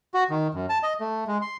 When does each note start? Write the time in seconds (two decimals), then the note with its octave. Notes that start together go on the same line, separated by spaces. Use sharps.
0.14 F#4
0.30 D#3
0.54 F#2
0.69 A5
0.83 D#5
1.00 A3
1.27 G#3
1.42 C6